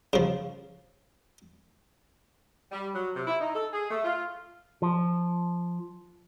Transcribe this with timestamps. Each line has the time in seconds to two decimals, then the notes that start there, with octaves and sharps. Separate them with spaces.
0.13 C#3 F3
2.72 G3
2.94 F#3
3.15 C3
3.27 E4
3.41 D#4
3.55 A4
3.73 G#4
3.91 A3
4.04 F4
4.82 F3